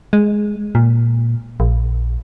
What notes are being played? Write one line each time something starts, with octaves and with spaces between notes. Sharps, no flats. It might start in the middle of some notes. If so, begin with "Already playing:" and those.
G#3
A#2
A#1